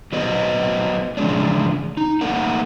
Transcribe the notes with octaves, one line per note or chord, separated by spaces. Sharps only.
F#3 B3 B4 C5 D#5
C#3 E3 F3 G#3 C#4 D4
D#4
A3 A#3 D#4 A#4 F#5